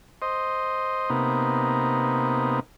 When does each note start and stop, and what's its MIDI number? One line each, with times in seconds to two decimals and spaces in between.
0.22 1.10 72
0.22 1.10 75
1.10 2.60 48
1.10 2.60 58
1.10 2.60 59
1.10 2.60 63